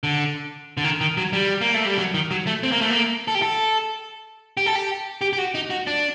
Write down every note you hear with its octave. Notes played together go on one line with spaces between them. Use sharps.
D3
D3
D#3
D#3
F#3
G3
A#3
A3
G3
F#3
D#3
F#3
A3
C4
A#3
A3
A#3
A4
G4
A4
G4
A4
G4
G4
G4
F#4
D#4
F#4
D4